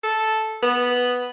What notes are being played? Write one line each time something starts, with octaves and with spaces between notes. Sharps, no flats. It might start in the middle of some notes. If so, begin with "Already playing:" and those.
A4
B3